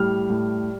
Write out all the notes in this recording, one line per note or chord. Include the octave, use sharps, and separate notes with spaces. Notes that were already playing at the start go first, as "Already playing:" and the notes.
Already playing: A2 G3 F6
A2